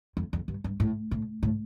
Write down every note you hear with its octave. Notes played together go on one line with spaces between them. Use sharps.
F2
F2
G2
G2
A2
A2
A2